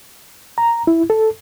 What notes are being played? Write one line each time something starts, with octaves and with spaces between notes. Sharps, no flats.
A#5
E4
A4